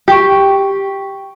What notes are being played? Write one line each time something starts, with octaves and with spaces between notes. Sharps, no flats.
G4 G5 C#6